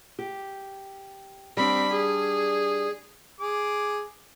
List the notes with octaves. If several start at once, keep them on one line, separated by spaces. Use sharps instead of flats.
G4
G3 C4 D4 B5
G#4
G#4 D6